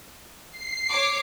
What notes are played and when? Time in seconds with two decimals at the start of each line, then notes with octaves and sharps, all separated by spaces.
0.51 C7
0.90 C#5 D6